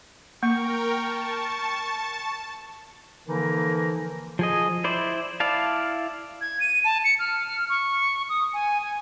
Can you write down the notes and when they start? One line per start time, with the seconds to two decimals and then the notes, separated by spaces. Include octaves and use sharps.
0.43 A#3 A#4 G5 C#6
0.94 A5
3.28 D3 E3 F3 A#3 D#4 A#4
4.39 F3 G#4 D#5
4.84 E4 C5 D5
5.40 E4 D5 F5 A5
6.41 G#6
6.60 D#7
6.84 A5
7.04 C#7
7.19 F6
7.69 C#6
8.29 D#6
8.53 G#5
8.82 G#5